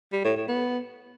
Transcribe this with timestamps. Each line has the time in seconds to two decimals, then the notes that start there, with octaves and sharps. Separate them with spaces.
0.12 G3
0.24 A2
0.36 A2
0.48 B3